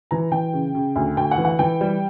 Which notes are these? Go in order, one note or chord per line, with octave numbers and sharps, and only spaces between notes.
E3 A#5
E3 G5
C#3
C#3
D2
D2 G5
F#5
E3
F#5
E3 G5
G3